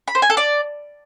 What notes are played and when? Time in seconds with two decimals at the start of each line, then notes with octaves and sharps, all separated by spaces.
0.08 B5
0.15 C5
0.22 G#5
0.30 A4
0.37 D5